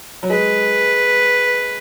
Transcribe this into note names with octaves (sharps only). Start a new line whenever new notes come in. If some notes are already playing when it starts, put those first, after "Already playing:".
F#3
G#3 B4